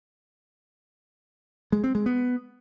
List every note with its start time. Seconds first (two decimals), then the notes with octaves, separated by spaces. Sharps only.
1.72 G#3
1.84 C4
1.95 G#3
2.06 B3